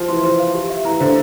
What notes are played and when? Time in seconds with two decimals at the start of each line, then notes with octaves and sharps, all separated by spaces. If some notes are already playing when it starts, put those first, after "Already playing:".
Already playing: F3 C5
0.08 E3 C6
0.23 E3 C5
0.39 F5
0.54 G4
0.70 E5
0.85 E3 A#5
1.00 D3 C5